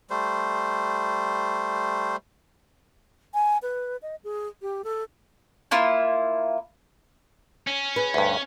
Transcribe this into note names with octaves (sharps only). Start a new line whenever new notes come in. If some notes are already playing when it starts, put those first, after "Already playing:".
G3 A3 C5
G#5
B4
D#5
G#4
G4
A4
A#3 E4 F4
C#4
G#4 B4
D2 G2